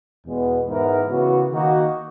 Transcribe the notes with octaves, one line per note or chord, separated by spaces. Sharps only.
E2 B2 G#3 B3
G#2 E3 B3 E4 A#4
C#3 E3 B3 F#4
D#3 A#3 D#4 F#4